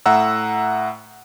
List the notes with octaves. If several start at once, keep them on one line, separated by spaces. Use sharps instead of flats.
A2 E5 F#5 A#5 E6